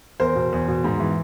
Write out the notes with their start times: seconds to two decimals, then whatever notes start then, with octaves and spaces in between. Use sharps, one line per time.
0.20 E2 A#4 C5
0.35 B2
0.52 E2
0.68 B2
0.84 G#2
1.00 E3